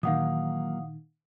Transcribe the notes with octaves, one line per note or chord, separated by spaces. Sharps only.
A#2 D#3 E3 F#3 A#3 F5 F#5 D#6